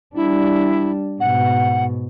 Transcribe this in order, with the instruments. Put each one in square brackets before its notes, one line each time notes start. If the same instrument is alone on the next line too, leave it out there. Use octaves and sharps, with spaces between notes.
[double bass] G3 D4 [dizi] E4
[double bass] G#2 B2 [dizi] F#5